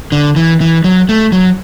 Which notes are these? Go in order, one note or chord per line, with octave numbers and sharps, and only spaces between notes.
D3
E3
E3
F#3
A3
F#3